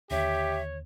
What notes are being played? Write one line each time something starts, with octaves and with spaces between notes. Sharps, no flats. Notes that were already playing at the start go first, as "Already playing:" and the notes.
D#2 D3 G4 C#5 E5